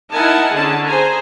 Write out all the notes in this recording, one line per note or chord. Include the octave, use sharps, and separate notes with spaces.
D#4 E4 A#4 F#5 G#5 A5
D3 C#4 G#4 A5
G#4 C5 G#5 A#5